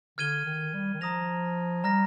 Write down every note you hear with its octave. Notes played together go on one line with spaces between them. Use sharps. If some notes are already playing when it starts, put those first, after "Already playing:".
D3 F6 G#6 D#7 G7
D#3
G3
D#3
F3 A#5 D#6 A#6 F7
G3 A#5 F6 A#6